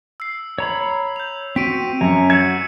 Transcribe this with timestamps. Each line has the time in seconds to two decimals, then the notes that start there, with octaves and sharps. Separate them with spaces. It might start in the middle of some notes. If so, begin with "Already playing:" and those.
0.20 E6 C7
0.58 C#5 A#5 B5
1.16 G6 F7
1.56 C4 F#4 B6 D7 D#7
2.01 F#2 C#5 A#5
2.30 F#4 E6 G#6 C#7 E7